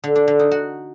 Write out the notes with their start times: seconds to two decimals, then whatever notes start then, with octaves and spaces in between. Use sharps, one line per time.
0.04 D3
0.16 D4
0.28 D3
0.39 D#4
0.51 F#4